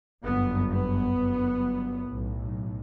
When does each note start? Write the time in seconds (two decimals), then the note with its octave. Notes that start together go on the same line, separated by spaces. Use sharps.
0.24 G1 F#2 B3
0.71 B3
1.18 G1 F#2
2.11 B1 A2